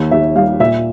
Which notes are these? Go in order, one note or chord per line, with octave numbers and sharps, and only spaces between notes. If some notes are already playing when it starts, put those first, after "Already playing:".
Already playing: D#2 D#3
D#2 E5
G3 F5
A#2 E5